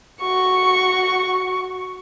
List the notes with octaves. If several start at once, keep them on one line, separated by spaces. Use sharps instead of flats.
F#4 C#6